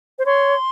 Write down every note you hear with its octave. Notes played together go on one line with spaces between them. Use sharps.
C5
C#5 C6